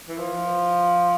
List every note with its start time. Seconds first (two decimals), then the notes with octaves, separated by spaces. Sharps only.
0.08 E3
0.18 F3